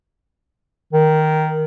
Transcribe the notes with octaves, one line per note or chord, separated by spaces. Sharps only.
D#3